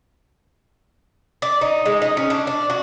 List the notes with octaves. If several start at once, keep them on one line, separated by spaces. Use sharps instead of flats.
D5
D#4
G#3
D#4
C#4
D4
D4
F#4